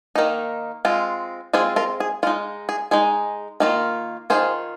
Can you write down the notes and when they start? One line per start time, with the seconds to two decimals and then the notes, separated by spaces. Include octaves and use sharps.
0.15 D#3 A#3 D#4
0.85 G#3 C4 F4
1.53 G#3 C4 F4 G#4 C5
1.76 F4 A#4
2.00 G#4
2.23 G#3 D#4 F4
2.69 G#4
2.91 G#3 D#4 G#4
3.60 D#3 A#3 F4
4.30 D#3 A#3 F4 G#4 C5